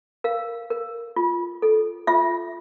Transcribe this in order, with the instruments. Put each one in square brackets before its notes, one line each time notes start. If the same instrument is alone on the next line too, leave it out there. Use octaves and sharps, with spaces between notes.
[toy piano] A#4 F5
A#4
F4
A4
F4 E5